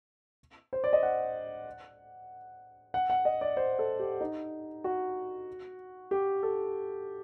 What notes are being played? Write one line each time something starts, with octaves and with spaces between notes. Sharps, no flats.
C5
D5
D#5
F#5
F#5
F#5
D#5
D5
C5
A4
G4
D#4
F#4
G4
A4